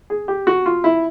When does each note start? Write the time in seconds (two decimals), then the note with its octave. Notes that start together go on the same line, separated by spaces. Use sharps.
0.10 G#4
0.28 G4
0.47 F#4
0.66 F4
0.84 E4